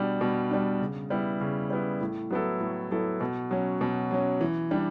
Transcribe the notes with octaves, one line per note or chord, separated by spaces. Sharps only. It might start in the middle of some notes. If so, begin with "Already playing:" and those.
Already playing: B2 G3 D4
B2
G3 D4
C#3
G3 B3 E4
C#3
G3 B3 E4
A2
F#3 B3 E4 A4
A2
F#3 B3 E4 A4
B2
F#3 C#4
B2
F#3 C#4
E3
G3 D4